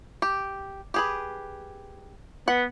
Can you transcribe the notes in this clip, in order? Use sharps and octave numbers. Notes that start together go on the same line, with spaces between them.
G4
G4 G#4 B4
B3 F#5